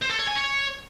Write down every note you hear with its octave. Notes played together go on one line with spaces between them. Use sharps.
C5
A4
C#5
G#5
C#5